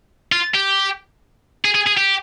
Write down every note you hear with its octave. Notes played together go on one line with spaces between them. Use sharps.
F4
G4
G#4
G#4
G#4
G4